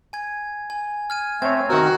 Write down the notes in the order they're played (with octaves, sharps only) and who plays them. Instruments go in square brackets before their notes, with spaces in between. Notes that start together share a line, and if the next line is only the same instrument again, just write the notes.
[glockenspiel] G#5 G#6
G#5
F6 G#6 D#7
[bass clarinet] A3 [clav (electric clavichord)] C4 C#5 [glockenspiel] G#6
[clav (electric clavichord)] D#3 C4 [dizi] F#4 [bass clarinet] A#4